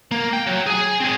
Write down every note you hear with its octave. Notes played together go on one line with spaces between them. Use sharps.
A#3
G5
F#3
G#4 G#5
C4 G#4